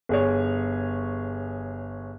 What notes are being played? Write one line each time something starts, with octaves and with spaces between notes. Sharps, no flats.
G1 G#4 C#5